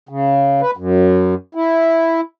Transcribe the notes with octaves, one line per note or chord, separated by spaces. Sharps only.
C#3
B4
F#2
E4